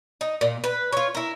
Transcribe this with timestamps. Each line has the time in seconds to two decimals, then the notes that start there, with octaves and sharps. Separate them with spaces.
0.21 D#4
0.41 A#2
0.64 B4
0.92 F4 C#5
1.15 E4 A#4